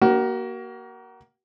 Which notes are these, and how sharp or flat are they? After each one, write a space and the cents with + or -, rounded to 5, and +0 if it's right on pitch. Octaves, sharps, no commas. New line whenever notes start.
A#3 +15 F#4 +35